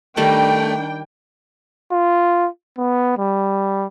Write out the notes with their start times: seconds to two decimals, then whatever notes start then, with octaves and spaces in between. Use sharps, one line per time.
0.17 D#3 G3 A3 D4 A#4 G5
1.92 F4
2.78 B3
3.18 G3